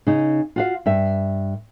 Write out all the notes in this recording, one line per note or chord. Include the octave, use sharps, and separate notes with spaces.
C#3 D#4
F4 F#4 F5
G2 E5